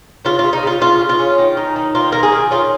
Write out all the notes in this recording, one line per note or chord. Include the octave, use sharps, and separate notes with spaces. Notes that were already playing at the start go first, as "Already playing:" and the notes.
C#3 F4
C#3 F4
D#4
C#3 F4
C#3 F4
C#3
F4
C#4
D#3
D#4
D#3
A#3 F4
D#3 A#4
G#4
D#3
C#4 F4